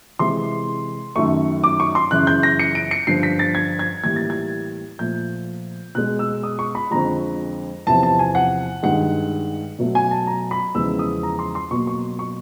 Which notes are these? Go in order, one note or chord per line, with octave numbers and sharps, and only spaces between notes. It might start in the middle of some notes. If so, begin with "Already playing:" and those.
C3 E3 G#3 C6
F#2 D#3 F#3 A3 C#6
D6
C#6
C6
F#2 C#3 E3 F#6
G6
A#6
C#7
D7
C#7
G2 D3 F3 C7
B6
A6
G#6
G#6
A2 E3 G3 A#3 G#6
A6
G#6
A#2 F3 A3 G6
B2 G#3 F#6
E6
D#6
C#6
B5
F2 D3 F3 G#3 A#5
E2 C3 F3 A5
A5
G#5
F#5
G2 D#3 G#3 F#5
B2 F#3 A3
G#5
A5
A#5
B5
E2 C#3 F3 G#3 E6
D#6
A#5
C6
C6
B2 F#3 A#3 C#6
C#6
C#6